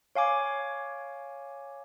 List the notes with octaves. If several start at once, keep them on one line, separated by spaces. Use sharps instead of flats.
C#5 F5 G#5 D6